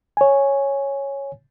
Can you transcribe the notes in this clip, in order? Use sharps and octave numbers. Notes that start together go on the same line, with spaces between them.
C#5 G#5